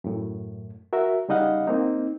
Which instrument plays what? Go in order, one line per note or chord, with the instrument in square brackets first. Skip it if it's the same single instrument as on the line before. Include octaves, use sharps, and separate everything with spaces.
[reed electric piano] F#2 A2
F#4 A#4 E5
C#3 G3 D#4 D#5 F5 F#5
A#3 C4 D#4